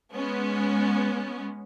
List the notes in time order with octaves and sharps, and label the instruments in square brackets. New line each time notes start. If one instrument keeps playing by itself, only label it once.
[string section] G#3 B3 C#4